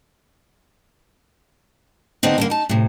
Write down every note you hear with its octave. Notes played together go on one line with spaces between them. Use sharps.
D3 B3 C4 D#4
G2 D3 A#3
D#4 A5
A2 C3